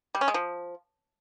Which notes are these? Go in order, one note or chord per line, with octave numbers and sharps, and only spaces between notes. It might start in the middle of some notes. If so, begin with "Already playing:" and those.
G3
C#4
G#3
F3